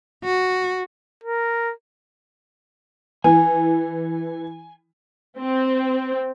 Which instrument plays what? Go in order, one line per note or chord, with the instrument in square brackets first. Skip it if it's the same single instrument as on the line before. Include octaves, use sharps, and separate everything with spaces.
[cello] F#4
[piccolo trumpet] A#4
[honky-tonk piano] E3 [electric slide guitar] G#5
[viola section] C4